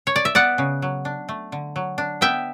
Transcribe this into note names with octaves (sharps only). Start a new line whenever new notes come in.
C#5
D5
E5
B3 D5 F#5
C#3
F#3
D4
A3
D3
F#3
D4
B3 E5 G5